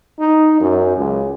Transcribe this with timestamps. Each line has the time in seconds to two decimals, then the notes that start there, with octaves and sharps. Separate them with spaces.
0.19 D#4
0.60 F#2
0.97 C#2